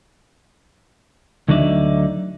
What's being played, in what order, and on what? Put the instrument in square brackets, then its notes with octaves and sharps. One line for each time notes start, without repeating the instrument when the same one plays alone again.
[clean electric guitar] D2 D3 F#3 D#4 D5 E5